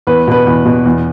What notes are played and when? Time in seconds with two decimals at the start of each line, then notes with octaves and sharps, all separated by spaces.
0.07 E2 B4
0.28 B2 B4
0.47 E2
0.66 B2
0.86 E2